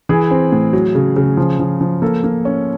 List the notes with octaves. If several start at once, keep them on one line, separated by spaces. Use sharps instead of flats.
E3 G#4
C4
A2
F#3
C#3
C#3
F3
F3
F3
A#3 A4
A#3
C#4